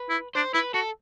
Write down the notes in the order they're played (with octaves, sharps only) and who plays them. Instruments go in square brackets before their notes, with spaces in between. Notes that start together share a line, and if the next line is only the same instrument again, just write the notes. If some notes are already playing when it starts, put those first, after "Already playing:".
Already playing: [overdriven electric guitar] B4
[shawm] E4
[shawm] D4 [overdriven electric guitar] C5
[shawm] E4 [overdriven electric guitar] B4
[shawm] F#4 [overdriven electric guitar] A4